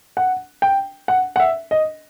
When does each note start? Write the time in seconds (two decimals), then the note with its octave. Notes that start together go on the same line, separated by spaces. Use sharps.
0.17 F#5
0.62 G5
1.08 F#5
1.36 F#5
1.40 E5
1.71 D#5